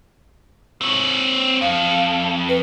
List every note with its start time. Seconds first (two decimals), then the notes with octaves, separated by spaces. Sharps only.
0.82 C4 C#5
1.61 F2 F5
2.49 B4